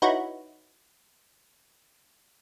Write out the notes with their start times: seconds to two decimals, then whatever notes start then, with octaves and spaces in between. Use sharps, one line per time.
0.02 D#4 E4 F#4 B4 C#5